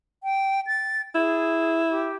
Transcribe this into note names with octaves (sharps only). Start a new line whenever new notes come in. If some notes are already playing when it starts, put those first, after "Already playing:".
G5
A6
E4 G#4
G4